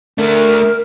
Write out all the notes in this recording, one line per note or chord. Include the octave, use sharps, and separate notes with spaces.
A3 D4 A#4